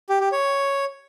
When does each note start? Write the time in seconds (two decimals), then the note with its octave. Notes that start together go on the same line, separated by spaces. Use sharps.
0.09 G4
0.21 G4
0.32 C#5